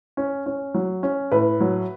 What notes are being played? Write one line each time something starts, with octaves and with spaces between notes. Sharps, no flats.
C#4
C#4
F#3
C#4
A2 B4
F#3